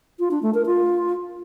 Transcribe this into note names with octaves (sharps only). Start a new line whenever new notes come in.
F4
D4
A3
A#4
F4